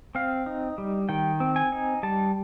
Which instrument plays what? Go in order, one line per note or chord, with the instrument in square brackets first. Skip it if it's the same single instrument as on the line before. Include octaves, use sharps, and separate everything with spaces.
[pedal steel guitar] C4 F5
D#4
G3
D#3 G5
C4
G#5
D#4
G3 A5